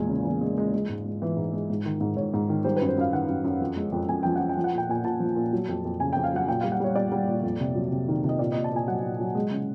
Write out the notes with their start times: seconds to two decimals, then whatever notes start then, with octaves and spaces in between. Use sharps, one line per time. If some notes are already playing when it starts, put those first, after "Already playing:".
Already playing: E2 A#2 G#3 G#5
0.09 C#3
0.25 E2
0.41 G#3
0.58 G#3
0.74 G#3
0.89 G#2
1.05 G#3
1.22 E3
1.37 G#2
1.53 G#3
1.70 G#2
1.85 D#3
2.01 G#2
2.17 G#2 C#5
2.34 G#2
2.49 D#3
2.64 G3 C5
2.76 B4
2.82 F#2
2.88 C5
2.98 F#2 F5
3.13 D#3 F#5
3.29 F#2
3.44 F#2
3.61 F2
3.76 G#3
3.92 F2
4.09 F2 G#5
4.23 F3 G5
4.36 F3 F#5
4.49 G5
4.57 F3
4.64 F#5
4.73 A#2
4.78 G5
4.89 A#2 G#5
5.04 A#2 A5
5.20 F3
5.36 A#2
5.53 F#3
5.69 F2
5.85 F2
6.00 C#3 G#5
6.13 F2 G5
6.24 F5
6.33 F#3 F#5
6.48 A#2 G5
6.61 G3 F5
6.72 F#5
6.80 G3 C#5
6.96 G3 D5
7.12 G3
7.28 A#2
7.43 F2
7.60 C3
7.76 F#3
7.91 C3
8.08 D#3
8.24 C3
8.29 D#5
8.39 A#2 D5
8.52 A#2 D#5
8.64 A5
8.72 A#2 G#5
8.88 F#3 F#5
9.03 A#2
9.20 F#3
9.35 G#3
9.51 C#3